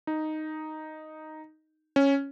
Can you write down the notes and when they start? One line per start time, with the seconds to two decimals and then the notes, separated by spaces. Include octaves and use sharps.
0.07 D#4
1.96 C#4